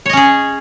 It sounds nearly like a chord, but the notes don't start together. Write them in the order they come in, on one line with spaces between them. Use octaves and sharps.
C#5 D#5 C#4 G#4